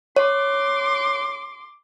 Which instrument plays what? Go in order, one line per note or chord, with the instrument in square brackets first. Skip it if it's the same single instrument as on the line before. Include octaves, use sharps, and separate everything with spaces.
[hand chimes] C#5 [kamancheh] C6 D6